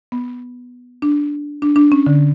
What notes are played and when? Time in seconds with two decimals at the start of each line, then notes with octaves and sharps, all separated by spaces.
0.12 B3
1.02 D4
1.62 D4
1.76 D4
1.92 C#4
2.06 D3